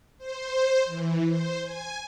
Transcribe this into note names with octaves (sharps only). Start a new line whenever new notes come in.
C5
E3
C5
G#5